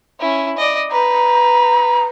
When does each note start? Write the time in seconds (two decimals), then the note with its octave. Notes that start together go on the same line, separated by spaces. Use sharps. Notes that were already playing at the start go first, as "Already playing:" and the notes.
0.19 C#4 E4
0.57 D5 D#5
0.91 B4 A#5